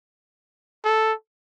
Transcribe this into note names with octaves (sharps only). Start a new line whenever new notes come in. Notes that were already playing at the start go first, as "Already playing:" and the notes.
A4